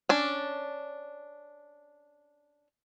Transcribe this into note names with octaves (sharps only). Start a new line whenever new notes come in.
C#4 D4